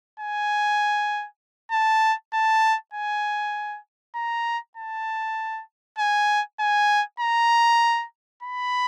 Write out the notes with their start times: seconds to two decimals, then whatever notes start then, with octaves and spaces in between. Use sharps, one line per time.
0.20 G#5
1.72 A5
2.34 A5
2.93 G#5
4.15 A#5
4.77 A5
5.99 G#5
6.60 G#5
7.20 A#5
8.43 B5